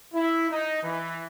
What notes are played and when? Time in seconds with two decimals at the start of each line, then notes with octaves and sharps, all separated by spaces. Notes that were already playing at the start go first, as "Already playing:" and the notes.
0.13 E4
0.50 D#4
0.82 E3